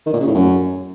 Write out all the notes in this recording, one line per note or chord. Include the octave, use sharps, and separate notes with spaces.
D#3
A#2
C#3
A2
F#2